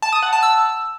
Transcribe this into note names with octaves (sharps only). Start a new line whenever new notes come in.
A5
D#6
F#5
A5
E6